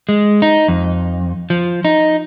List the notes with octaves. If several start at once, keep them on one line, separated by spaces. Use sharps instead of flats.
G#3
D#4
F2
F3
D#4